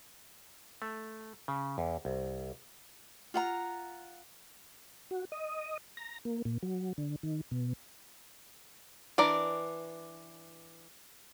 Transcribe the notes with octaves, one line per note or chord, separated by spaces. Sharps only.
A3
C#3
E2
C2
F4 F#5 A#5
F#4
D#5
A#5
A#3
A#2
F#3
D3
D#3
B2
E3 D4 A#4 D5